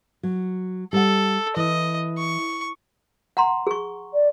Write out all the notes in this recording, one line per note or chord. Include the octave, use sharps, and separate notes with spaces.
F#3
G3 A4 D5 F#5
E3 D#5
C#6
F#5 A#5 C6
G#4 C#6
D5